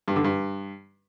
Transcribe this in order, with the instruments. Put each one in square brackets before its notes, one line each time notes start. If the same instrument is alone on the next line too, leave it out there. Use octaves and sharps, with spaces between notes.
[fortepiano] G2
D3
G2